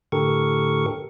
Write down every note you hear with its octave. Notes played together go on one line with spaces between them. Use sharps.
A2 D3 G4 A4 A#4 C#6